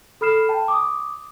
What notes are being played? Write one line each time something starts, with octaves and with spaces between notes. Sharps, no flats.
A4 B5 F6 C7 E7
G5 A5
D6 D#6